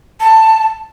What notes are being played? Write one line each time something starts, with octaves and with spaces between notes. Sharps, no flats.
A5